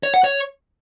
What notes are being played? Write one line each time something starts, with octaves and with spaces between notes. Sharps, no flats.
C#5
F#5
C#5